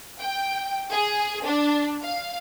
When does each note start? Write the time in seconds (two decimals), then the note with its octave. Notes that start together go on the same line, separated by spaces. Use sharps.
0.20 G5
0.91 G#4
1.44 D4
2.01 F5